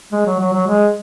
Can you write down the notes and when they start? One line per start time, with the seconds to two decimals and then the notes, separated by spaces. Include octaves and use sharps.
0.12 G#3
0.26 F#3
0.40 F#3
0.53 F#3
0.67 G#3